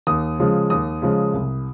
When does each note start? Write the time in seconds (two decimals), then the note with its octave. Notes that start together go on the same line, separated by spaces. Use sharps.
0.07 D#2 D#6
0.39 C#3 F3 G#3
0.70 D#2 D#6
1.02 C#3 F3 G#3
1.33 C2